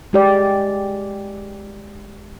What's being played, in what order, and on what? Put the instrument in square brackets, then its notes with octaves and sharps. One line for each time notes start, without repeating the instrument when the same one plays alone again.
[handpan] G#3 G4 D5